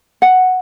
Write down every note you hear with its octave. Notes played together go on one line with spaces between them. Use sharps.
F#5